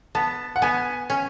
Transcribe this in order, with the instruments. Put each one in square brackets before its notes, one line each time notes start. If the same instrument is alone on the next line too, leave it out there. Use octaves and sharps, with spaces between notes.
[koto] B3 [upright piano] A5
[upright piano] F#5
[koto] B3 [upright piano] G#5
[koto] C#4